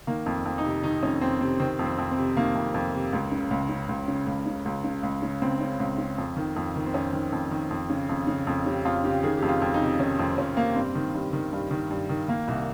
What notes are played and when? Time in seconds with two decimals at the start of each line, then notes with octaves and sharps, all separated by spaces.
0.07 D#3 A#3
0.26 F2
0.45 F2
0.58 D#4
0.64 C3
0.83 D#3 D#4
1.03 F2 C#4
1.21 F2 C4
1.41 C3 C4
1.60 D#3 C4
1.79 F2
1.86 C4
1.98 F2
2.11 C4
2.17 C3
2.36 D#3 A#3
2.55 F2
2.74 F2
2.94 C3
3.13 C#2
3.32 C#3
3.51 C#2
3.69 C#3
3.89 C#2
4.08 C#3
4.27 C#2
4.46 C#3
4.65 C#2
4.84 C#3
5.03 C#2
5.22 C#3
5.42 C#2 C4
5.61 C#3
5.80 C#2
5.98 C#3
6.18 F2
6.37 D#3
6.56 F2
6.76 D#3
6.86 C4
6.94 F2 C#4
7.13 D#3
7.32 F2
7.51 D#3
7.71 F2
7.90 C#3
8.09 F2
8.27 C#3
8.47 F2
8.66 C#3 G4
8.85 F2 F4
9.04 C#3 G4
9.23 D#3 G#4
9.37 G4
9.42 F2
9.49 F4
9.62 F2
9.74 D#4
9.80 C3
9.99 D#3 C#4
10.19 F2 C4
10.38 F2 C#4
10.57 C3 A#3
10.76 G2 C4
10.95 D#3
11.14 G2
11.33 D#3
11.53 G2
11.71 D#3
11.90 G2
12.09 D#3
12.28 D#3 A#3
12.48 C2